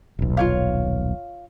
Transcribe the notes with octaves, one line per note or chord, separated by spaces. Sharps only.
D#1 B1
F4 C#5 F5